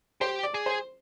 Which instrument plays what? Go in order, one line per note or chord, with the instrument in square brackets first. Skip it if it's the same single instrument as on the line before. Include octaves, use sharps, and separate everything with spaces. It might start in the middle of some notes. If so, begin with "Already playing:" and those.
[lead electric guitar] G4 [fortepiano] C5
[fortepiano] D5
[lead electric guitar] G#4
[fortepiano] C5